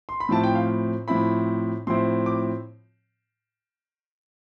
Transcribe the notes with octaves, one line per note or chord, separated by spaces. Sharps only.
C6
B5
A2 F3 C4 E4 A5
G5
F5
A2 F3 C4 E4 B5
A2 F3 C4 E4 C6
D6